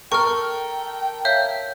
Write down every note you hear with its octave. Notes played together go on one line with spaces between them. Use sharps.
A4 A#4 G5 C#6 F6
C#5 E5 F5 G6